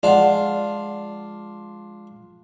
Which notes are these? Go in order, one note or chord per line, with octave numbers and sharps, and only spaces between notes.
F3 G#3 D4 F4 D5 F#5